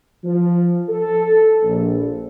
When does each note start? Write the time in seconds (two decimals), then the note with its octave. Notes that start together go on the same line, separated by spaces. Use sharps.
0.24 F3
0.89 A4
1.63 A#1